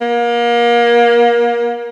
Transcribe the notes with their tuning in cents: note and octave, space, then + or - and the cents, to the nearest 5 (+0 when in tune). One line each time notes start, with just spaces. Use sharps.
A#3 +30